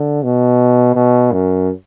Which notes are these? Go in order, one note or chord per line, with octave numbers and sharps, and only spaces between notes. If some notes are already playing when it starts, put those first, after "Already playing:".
Already playing: D3
B2
B2
F#2